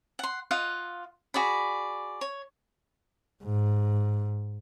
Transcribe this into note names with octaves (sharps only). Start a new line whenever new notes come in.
F#5 C6
F4 D#5 F5 F#5
F#4 G#4 D5 B5
C#5
G#2